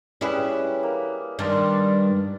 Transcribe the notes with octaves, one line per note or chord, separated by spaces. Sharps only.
G3 C#4 E4 G#4 B4
A#3
G2 D#3 D4 A5 C6